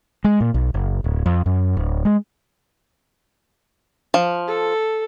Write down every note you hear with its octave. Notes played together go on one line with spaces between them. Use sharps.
G#3
A#2
B1
F#1
D1
F2
F#2
D1
G#3
F3
A4